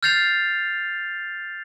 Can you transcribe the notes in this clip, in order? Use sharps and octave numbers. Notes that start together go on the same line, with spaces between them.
F6 G6 A6 C7 F7